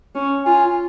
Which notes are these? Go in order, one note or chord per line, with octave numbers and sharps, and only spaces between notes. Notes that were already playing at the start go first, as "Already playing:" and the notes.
C#4
F4 G#5